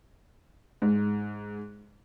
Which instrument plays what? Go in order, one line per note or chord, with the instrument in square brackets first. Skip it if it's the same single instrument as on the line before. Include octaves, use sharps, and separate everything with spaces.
[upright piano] G#2